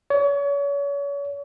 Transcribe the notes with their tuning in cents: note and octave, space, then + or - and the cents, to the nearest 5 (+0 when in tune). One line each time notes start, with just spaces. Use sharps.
C#5 +35